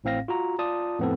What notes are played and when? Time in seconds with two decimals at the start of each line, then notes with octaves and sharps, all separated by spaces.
0.04 A1 A2 C4 F5 A#6
0.28 F4 F#4 A#5
0.59 F4 D5 A5 D#6
0.99 F2 A2 B3 C4 A4